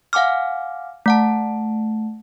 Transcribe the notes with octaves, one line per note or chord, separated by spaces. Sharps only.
F5 F#5 G#5 D6 F6
A3 F#5 A5